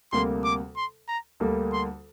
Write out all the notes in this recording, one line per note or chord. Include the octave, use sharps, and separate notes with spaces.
D2 C3 G3 A#3 C6
D6
C6
A#5
D2 D3 G3 A#3
C6